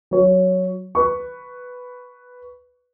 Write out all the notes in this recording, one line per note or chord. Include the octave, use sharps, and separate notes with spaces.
F#3 C#5
B4 C#6